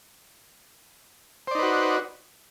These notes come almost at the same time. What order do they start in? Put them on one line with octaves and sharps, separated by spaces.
C5 D5 D#4 B4 F#4